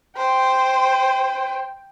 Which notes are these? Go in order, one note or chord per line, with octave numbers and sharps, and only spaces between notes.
C5 G5